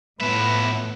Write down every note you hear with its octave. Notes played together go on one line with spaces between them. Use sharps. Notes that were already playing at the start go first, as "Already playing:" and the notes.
A2 F3 B3 B4 E5